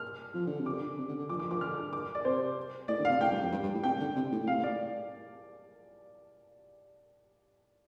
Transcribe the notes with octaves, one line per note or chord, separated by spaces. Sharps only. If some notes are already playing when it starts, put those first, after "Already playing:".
Already playing: F6
F3
D3
C3
D6
D3
C3
D3
D3
F3 D6
F3 D6
F3 D6
D3 F6
D6
D5
C3 C5
A2 D5
D3
F5
C3
A2 G5
G2
F2
G2
G2
A2
C3 G5
D3
C3
A2
A2
C3 F5
A2
D5